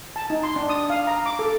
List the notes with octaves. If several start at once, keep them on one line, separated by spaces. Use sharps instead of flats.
A5
D#4
C6
D4
D#6
F5
A#5
D6
A4